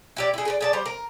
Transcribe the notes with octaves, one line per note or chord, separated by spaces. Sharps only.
E4 G4 D5
E4 G#4
G#4 B4 D5
G#4 D5 A5
G3 C5
A#4